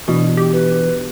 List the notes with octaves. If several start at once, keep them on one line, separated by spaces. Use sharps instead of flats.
B2 E3 D4
G4
B4